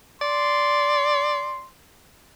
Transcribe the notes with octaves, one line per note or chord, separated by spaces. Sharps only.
D5 C6